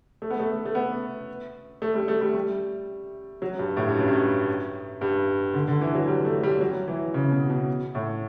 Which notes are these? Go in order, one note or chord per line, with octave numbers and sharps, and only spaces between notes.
A3
B3
A3
A3
B3
A3
G3
A3
G3
G3
F#3
G2
A2
G2
F#2
G2
G2
D3
D3
E3
F#3
G3
A3
G3
F#3
E3
C#3
B2
B2
A2